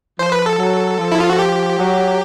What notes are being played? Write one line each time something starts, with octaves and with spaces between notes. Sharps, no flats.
F3 C5
B4
A4
F#3
F3
E4
F4
F#4
G4
F#3